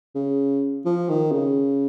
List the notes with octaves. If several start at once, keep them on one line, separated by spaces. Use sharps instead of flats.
C#3
F3
D#3
C#3